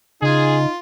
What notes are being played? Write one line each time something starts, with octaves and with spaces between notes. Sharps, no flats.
C#3 D#4 F4 G#4